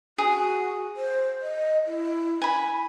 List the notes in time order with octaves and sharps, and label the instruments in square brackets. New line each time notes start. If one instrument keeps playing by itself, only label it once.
[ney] F#4 [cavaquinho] G#4
[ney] C5
D#5
E4
[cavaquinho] G#5 B5